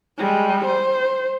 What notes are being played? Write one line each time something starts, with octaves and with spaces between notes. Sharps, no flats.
G3 G#3
C5